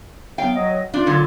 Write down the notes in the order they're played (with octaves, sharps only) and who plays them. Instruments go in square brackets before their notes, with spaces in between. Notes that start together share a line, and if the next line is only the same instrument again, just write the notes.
[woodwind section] F#3 B3 [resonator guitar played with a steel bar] F5 G5
[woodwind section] F#3 D#5
[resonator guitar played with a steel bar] D4 [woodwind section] F4
[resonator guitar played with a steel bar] A#2 D3 F#3